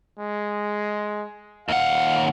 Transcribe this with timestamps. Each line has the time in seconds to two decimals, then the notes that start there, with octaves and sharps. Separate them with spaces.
0.19 G#3
1.69 D#2 F5 F#5